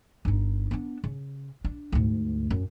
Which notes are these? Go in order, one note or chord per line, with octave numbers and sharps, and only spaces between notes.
G1 D#4
B3 D4
C#3
D4
D2 G#2
F#2